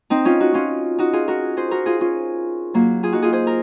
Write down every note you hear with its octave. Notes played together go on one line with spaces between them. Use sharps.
C4 D#4
C#4 F4
D#4 F#4
C#4 F4
D#4 F#4
F4 G#4
F#4 A#4
G#4 C5
F#4 A#4
F4 G#4
C#4 F4
F#3 A#3
F4 G#4
D#4 F#4
F4 G#4
G#4 C5
A#4